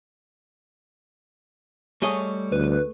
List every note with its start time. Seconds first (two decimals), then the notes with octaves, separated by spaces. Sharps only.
2.02 G3 A3 G#4 C#5 D#5
2.52 D2 B4